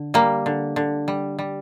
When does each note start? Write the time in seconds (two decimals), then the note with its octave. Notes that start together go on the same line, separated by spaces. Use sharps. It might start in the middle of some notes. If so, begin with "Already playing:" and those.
Already playing: D3
0.14 G3 A#3
0.46 D3
0.76 D3
1.08 G3
1.39 G3